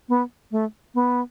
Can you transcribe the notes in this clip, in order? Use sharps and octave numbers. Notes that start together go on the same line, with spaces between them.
B3
A3
B3